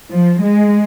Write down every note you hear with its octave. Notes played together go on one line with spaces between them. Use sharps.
F3
G#3